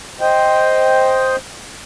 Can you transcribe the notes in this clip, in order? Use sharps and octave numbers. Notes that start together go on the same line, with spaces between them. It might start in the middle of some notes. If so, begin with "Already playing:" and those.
C5 D#5 G5